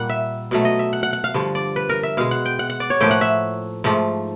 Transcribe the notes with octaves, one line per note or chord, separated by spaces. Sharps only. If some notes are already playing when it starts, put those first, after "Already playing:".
Already playing: A#2 G3 A#3 F#5
E5
B2 F#3 A3
D#5
E5
F#5
F#5
F#5
F5
G2 D3 F3
D5
B4
A#4
E5
B2 G#3 F5
F#5
G5
F#5
F#5
D5
C#5
A2 F3 A#3 G5
F#5
E5
G#2 F3 A3